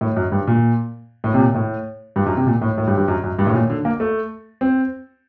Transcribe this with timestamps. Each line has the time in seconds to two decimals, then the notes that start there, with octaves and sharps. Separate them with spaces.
0.01 A2
0.16 F#2
0.32 G2
0.47 A#2
1.24 A2
1.34 C3
1.39 A#2
1.54 A2
2.16 G2
2.26 F#2
2.37 C3
2.47 A#2
2.62 A2
2.78 A2
2.87 G2
2.98 G2
3.08 F#2
3.24 F#2
3.39 G2
3.47 A2
3.54 A#2
3.70 D3
3.85 A#3
4.00 A3
4.61 C4